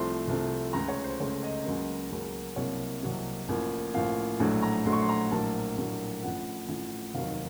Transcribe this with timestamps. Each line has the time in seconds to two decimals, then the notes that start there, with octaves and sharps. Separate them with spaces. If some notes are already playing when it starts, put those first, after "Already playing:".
Already playing: C2 C3 F3 A3 C6
0.28 C2 C3 F3 A3
0.73 C#2 C#3 A3 A#5
0.88 C#5
1.04 C5
1.20 C#2 C#3 A3 C#5
1.43 D#5
1.65 C#2 C#3 F#3 A#3
2.11 C#2 C#3 F#3 A#3
2.56 C2 C3 F#3 A#3 C#5
3.03 C2 C3 F#3 A#3
3.49 A1 A2 F3 A#3
3.94 A1 A2 F3 A#3 F5
4.39 A#1 A2 F#3 A3 F#5
4.62 A#5
4.85 A#1 A2 F#3 A3 C6
4.92 C#6
5.01 C6
5.09 A#5
5.31 A#1 A2 F#3 A#3 A5
5.78 A#1 A2 F#3 A#3
6.22 A1 A2 F3 F#5
6.68 A1 A2 F3
7.14 F1 D#2 D#3 F#3 F5